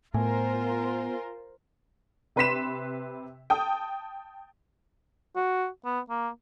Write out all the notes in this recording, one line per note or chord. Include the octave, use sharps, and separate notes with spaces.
A2 B3 F4 A#4 C5 G#5
C3 B4 C6 B6 E7
G5 A5 D#6
F#4
B3
A#3